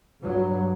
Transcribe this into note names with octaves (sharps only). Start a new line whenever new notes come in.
G2 F#3